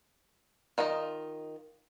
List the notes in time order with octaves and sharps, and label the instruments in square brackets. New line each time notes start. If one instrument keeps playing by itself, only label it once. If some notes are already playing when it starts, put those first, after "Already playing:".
[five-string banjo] D#3 D#4 F4 D#5